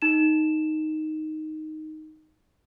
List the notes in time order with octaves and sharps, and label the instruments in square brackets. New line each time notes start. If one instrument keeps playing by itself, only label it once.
[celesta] D#4 E7